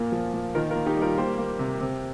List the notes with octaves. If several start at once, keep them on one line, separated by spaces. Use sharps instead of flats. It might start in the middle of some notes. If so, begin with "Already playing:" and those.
Already playing: A#2 A#3
F3
A#2
D#3 F4 A#4
F4 A#4
A#3
D#4 G4
G3 F4 A#4
A#3 G4 C5
A#3
C3
C3